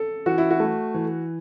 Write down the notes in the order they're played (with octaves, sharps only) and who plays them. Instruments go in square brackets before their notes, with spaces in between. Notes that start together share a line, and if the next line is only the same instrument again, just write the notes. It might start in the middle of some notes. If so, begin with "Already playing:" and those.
Already playing: [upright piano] A4
[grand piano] E3 [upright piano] F#4
[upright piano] E4
F#4
[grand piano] A3
E3